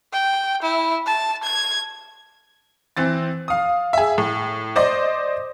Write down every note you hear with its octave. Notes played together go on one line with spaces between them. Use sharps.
G5
E4
A5
G#6
E3 C4 A6
F5 D#6
G#4 E5
A2
C5 D5 D#5